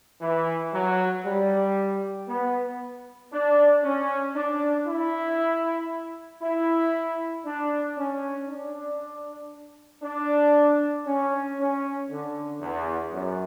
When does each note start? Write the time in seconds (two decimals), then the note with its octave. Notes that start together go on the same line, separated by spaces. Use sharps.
0.22 E3
0.73 F#3
1.25 G3
2.28 B3
3.32 D4
3.83 C#4
4.35 D4
4.87 E4
6.42 E4
7.45 D4
7.97 C#4
8.48 D4
10.03 D4
11.06 C#4
11.58 C#4
12.10 D3
12.61 E2
13.13 F#2